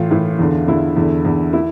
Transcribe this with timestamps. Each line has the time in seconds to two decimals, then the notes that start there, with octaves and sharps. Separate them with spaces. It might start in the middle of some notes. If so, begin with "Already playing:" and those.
Already playing: A2 E3 F4
0.11 A2 E3
0.39 E2 D3
0.67 E2 D3 E4
0.96 E2 D3
1.25 E2 D3
1.53 E4